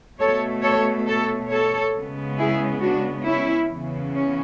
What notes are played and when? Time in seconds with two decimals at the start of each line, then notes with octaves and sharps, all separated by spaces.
0.20 B2 A3 A4 C#5
0.63 A4 C#5
1.06 A4 C#5
1.50 A4 C#5
1.94 C#3 G#3 B3
2.38 E4 G#4
2.81 D4 F#4
3.25 C#4 E4
3.69 E2 C#3 E3 B3
4.13 C#4